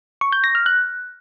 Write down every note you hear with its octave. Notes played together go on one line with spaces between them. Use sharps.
C#6
G6
A#6
F6
F#6